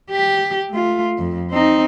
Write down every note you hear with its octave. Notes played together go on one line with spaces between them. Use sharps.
G4
A3 F4
F2
C4 D#4